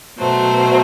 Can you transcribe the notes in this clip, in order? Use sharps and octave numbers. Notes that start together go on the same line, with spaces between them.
B2 F#3 A3 C5